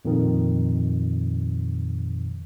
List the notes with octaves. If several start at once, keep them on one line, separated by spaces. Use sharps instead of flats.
F2 A#2 D#3